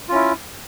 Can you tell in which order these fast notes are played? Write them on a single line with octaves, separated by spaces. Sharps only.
F4 C#4 E4